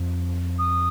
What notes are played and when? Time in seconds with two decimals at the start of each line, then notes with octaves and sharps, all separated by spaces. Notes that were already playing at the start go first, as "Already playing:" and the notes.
Already playing: F2
0.58 D#6